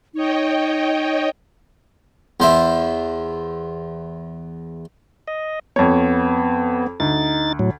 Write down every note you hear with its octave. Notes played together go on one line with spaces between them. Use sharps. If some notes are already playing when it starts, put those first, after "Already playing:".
D#4 C#5 D#5 G5
E2 C5 E5
D#5
F2 B3 C#5
D2 D#4 A6
A2 F#3